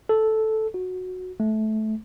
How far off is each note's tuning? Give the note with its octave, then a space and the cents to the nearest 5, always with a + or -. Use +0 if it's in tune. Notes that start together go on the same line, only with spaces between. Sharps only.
A4 -5
F#4 -10
A3 -20